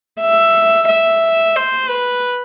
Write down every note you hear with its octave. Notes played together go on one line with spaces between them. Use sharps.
E5
E5
C5
B4